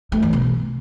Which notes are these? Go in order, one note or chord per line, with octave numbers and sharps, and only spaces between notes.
A3
E3
B2